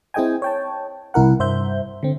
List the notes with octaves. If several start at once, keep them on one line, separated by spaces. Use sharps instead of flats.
C4 E4 G#4 D#5 G5 G#5
C#5 G5 A5
C2 E4 A#4 F#5
G2 C5 E5 G6
D3 C4